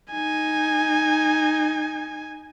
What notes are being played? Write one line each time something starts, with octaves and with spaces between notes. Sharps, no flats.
D#4 G#5